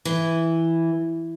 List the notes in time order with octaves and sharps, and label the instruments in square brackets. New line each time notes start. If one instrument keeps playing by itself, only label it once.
[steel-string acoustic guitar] E3